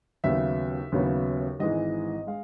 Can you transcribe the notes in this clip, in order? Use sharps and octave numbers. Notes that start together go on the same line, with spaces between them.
D#2 C#3 F#3 B3 E5
D#2 C#3 F#3 B3
G#1 G#2 E3 G#3 D#5
G#3 F5